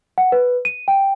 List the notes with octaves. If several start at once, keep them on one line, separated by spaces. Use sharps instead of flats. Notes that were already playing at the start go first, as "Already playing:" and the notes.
F#5
B4
D#7
G5